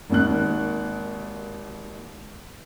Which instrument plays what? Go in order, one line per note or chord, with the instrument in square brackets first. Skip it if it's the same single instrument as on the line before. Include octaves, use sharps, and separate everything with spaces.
[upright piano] G#1 D#2 F#6